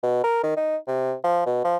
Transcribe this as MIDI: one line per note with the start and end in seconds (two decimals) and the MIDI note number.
0.03 0.20 47
0.24 0.40 70
0.43 0.57 51
0.57 0.77 63
0.87 1.14 48
1.24 1.41 53
1.46 1.60 47
1.65 1.77 53